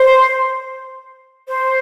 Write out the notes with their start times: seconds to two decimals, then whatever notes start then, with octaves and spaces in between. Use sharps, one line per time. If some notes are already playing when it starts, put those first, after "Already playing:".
Already playing: C5
1.48 C5